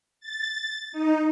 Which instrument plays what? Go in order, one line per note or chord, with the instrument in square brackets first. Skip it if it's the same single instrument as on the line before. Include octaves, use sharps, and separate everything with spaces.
[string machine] A6
D#4